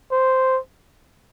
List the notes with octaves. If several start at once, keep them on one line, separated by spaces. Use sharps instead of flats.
C5